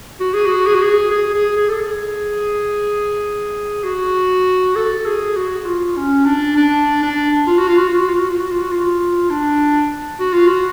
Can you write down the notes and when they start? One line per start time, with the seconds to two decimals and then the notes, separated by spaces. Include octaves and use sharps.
0.20 F#4
0.34 G#4
0.46 F#4
0.67 G#4
0.75 F#4
0.83 G#4
1.11 G#4
1.34 G#4
1.57 G#4
1.69 A4
1.80 G#4
3.84 F#4
4.75 A4
5.06 G#4
5.36 F#4
5.66 F4
5.97 C#4
6.26 D4
6.57 D4
7.03 D4
7.47 F4
7.59 F#4
7.68 F4
7.78 F#4
7.89 F4
7.99 F#4
8.09 F4
8.20 F#4
8.30 F4
8.41 F#4
8.51 F4
8.62 F#4
8.72 F4
9.30 D4
10.20 F#4
10.34 F4
10.48 F#4